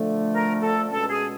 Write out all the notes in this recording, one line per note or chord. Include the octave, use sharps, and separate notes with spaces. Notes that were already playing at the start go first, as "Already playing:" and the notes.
Already playing: D3 F3 A3
A#4
A4
C#2 B2 G#3 C#4 A4
G#4